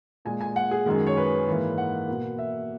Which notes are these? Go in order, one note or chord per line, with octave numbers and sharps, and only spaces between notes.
A#2 G#3 G#5
G#5
F#5
G#4
F#2 D#3 G#3
C#5
B4
G#2 E3 A#3
F#5
B2 A#3
E5